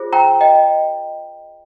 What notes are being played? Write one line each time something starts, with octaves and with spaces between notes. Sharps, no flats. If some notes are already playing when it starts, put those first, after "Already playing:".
Already playing: F4 G#4 C5
G5 A#5
D#5 G5